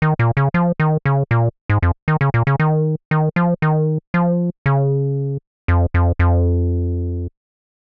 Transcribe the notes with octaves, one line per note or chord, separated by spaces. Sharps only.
D#3
A#2
C#3
F3
D#3
C#3
A#2
G#2
F2
D#3
C#3
A#2
C#3
D#3
D#3
F3
D#3
F3
C#3
F2
F2
F2